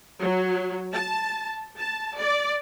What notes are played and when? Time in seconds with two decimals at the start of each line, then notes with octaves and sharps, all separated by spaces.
0.20 F#3
0.93 A5
1.78 A5
2.19 D5